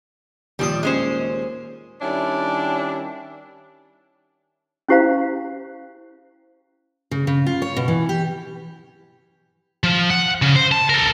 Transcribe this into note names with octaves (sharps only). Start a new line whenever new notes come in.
D#2 A#2 F3 G3 D#6
G#3 C#4 C5
D#3 G3 C#4 D4 E4 C#5
C#4 E4 G4 C5 F5 A#5
C#3
C#3
F4
C#5
B2
E3
G4
F3
F#5
C#3
C5
A5
A4 A#4